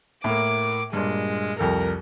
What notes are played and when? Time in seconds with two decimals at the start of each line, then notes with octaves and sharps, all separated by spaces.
0.24 A2 A#3 D6
0.93 G2 A#2 G#3
1.59 C2 F2 A4 A#4